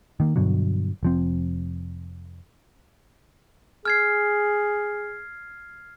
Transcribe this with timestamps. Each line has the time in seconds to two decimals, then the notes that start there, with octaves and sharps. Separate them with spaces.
0.20 D#3 A#3
0.36 G2 B2 D3 F#3
1.03 F1 F3 C4
3.85 G#4 F6 G#6 C7